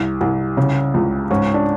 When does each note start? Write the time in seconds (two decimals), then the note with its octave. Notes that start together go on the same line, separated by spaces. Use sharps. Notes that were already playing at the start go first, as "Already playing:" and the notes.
Already playing: C2
0.21 C2
0.57 C#3
0.94 C#2
1.30 G#2 C#4
1.54 D4